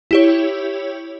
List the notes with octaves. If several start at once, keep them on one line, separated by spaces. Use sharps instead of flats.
E4 G4 C#5